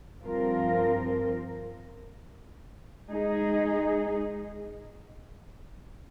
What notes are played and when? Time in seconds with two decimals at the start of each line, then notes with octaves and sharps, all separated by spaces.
0.24 G2 F3 C4 F4 A#4
3.09 G#3 D#4 G#4